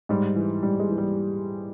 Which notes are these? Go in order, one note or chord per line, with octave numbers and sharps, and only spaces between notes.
G#2 G3
E3
G#2 G3
G#3
E3
G3